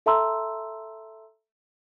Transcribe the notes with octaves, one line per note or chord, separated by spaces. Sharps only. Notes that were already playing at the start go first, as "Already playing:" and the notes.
A4 E5 A5 A#5 C6 E6